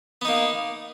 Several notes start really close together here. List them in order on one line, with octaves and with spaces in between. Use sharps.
B3 D#4 A#3